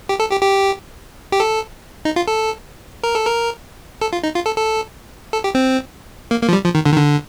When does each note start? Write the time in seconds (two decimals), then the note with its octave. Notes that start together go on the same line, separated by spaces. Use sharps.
0.09 G4
0.20 A4
0.31 G4
0.41 G4
1.32 G4
1.40 A4
2.05 D#4
2.16 F4
2.28 A4
3.03 A#4
3.15 A4
3.27 A#4
4.01 A4
4.13 F4
4.24 D#4
4.35 F4
4.46 A4
4.57 A4
5.33 A4
5.44 G4
5.55 C4
6.31 A#3
6.42 A#3
6.49 F3
6.53 G3
6.64 F3
6.75 D#3
6.86 D3
6.92 D#3
6.97 D3